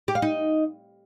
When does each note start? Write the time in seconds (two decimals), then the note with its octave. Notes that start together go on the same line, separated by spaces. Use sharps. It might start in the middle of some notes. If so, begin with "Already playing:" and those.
0.08 G4
0.15 F5
0.22 D#4